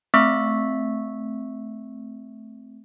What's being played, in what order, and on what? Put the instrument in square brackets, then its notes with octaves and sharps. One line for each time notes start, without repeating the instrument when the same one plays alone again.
[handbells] A3 C4 E5 C#6 E6 B6